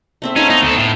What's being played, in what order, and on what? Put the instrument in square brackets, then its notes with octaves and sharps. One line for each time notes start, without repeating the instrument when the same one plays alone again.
[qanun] A3 C4 E5
[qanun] A3 D#4 F5 [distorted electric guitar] C#4
[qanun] B3 [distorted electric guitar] D#4
[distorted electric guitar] D2 A4
A2